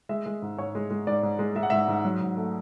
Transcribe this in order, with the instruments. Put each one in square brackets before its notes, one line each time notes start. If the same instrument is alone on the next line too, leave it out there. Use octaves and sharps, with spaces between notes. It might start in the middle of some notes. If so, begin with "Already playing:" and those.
[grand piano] G#3 E5
G#3
G#2
G#2 C#5
G#3
G#3
G#2 D5
G#2
G#3
G#3 E5
F#5
G#2 E5
G#2
F#3
G#2
A3